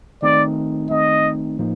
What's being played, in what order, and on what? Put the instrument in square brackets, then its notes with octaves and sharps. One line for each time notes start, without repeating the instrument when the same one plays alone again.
[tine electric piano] D#3 A3 C4 D#4 [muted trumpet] D5
[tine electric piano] D#3 A3 C4 D#4 [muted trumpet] D#5
[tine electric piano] A2 F3 A#3 D#4